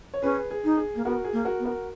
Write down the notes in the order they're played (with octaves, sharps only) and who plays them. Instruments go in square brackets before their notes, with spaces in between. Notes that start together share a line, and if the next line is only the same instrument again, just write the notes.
[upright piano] C#5
[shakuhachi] C#4 [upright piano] G#4 B4
[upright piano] G#4
[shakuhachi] D#4
[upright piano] G#4
[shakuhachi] A#3
[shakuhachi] B3 [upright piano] F#4 A#4
[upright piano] G#4
[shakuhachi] A#3
[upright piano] F#4 A#4
[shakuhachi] B3
[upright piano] F#4 A#4